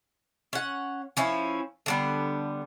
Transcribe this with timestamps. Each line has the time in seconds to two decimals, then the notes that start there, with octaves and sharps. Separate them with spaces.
0.53 C#4 F#5
1.17 F3 C#4 E4
1.86 D3 G3 B3